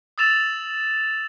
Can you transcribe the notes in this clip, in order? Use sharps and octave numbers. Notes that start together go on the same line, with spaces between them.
D#6 E6 A6 E7 F7